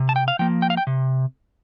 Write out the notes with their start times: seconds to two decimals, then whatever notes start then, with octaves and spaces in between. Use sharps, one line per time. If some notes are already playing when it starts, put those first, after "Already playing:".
Already playing: C3
0.09 A5
0.16 G5
0.28 F5
0.39 F3 A#3 G5
0.62 G5
0.70 F5
0.77 G5
0.87 C3